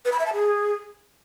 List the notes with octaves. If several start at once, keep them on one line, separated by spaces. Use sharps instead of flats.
B4
B5
E5
A5
G#4